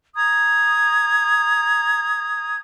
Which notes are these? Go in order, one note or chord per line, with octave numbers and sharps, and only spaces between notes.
A#5 D#6 G#6